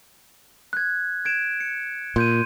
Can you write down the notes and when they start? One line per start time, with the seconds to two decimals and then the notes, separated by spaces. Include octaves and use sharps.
0.73 F#6 G#6
1.25 G#6 D7 E7
1.60 C#7
2.16 A#2 C6 G6 D#7